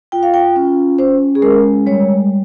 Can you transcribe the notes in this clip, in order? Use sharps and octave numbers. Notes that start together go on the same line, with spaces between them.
F4 G5
F5
G5
C#4
C#4 C5
G#4
G#3 A#4
G3 C#5